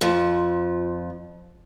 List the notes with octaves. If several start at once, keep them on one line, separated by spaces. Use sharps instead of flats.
F2 F3